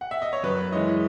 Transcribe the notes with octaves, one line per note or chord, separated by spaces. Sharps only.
F#5
E5
D#5
C#5
F#2 B4
E3 G#3 C#4 E4 D#5